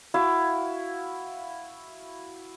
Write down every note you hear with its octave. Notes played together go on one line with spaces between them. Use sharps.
E4 F#4 F5